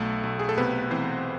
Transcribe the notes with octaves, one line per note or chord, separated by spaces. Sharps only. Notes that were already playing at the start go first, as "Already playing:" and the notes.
Already playing: B1 A3 A4
B1
G#4
A4
C3 B3 B4
E3 C4 C5